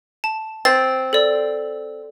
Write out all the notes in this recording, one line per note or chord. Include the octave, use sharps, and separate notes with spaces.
A5
C4 A6
A4 D5